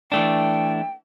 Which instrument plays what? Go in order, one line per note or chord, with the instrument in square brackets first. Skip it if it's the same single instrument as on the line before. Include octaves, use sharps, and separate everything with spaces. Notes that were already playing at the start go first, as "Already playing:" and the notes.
[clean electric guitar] E3 A3 D4 [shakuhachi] G5